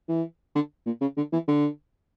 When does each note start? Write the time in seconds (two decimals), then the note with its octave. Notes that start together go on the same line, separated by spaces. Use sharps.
0.09 E3
0.55 D3
0.86 A#2
1.01 C#3
1.17 D3
1.33 E3
1.48 D3